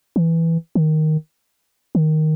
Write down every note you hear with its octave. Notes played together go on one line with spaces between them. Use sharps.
E3
D#3
D#3